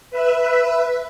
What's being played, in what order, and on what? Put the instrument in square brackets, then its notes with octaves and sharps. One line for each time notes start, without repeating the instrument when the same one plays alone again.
[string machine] B4 E5